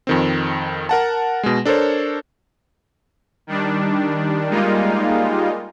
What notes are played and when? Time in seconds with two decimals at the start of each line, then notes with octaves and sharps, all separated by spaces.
0.07 F2 D#3 C4
0.89 A#4 F#5 A5
1.43 B2 G#3
1.65 D4 A4 A#4 C5 C#5
3.47 D#3 G3 D4
4.49 G3 G#3 A#3 D#4 F4